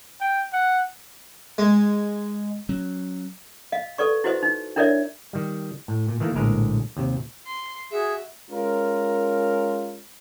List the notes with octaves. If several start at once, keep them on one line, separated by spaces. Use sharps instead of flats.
G5
F#5
G#3
F#3 C#4
D#5 F5
A4 B4 D5 C#6
E4 F#4 B4 C5 D#5
D#4
D4 E4 A#4 C#5 D5 E5
D#3 G3
A2
A#2
D#3 E3 A3 A#3
A#1 A2 D3 G#3 A#4
D#2 C3
C6
F#4 G#4 E5
G#3 C#4 F4 A#4